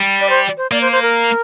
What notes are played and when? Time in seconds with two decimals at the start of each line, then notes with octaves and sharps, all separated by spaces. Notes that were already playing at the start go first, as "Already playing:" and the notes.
Already playing: G3
0.21 D5
0.30 C5
0.57 C5
0.71 A#3 D5
0.82 C5
0.92 C5
1.02 A#4